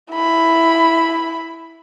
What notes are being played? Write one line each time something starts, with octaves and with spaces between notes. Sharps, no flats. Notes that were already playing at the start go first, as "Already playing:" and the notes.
E4 B5